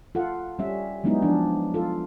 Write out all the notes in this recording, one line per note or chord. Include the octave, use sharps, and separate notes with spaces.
F4 A4 F#5
G3 C#4 E5
F#3 G#3 B3 C#4 D#4 E4
F3 D4
F4 A4